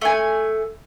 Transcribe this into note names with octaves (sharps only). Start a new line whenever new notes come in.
A3 G#5